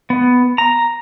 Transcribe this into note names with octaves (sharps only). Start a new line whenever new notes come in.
B3
A#5